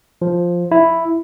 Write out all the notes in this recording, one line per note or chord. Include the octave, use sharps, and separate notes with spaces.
F3
E4